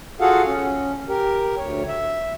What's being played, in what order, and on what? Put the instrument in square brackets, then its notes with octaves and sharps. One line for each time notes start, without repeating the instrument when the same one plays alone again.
[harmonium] F4 F#4 G#4 A4 F5 F#5
C#4
G4 A#4
D2 C#5
E5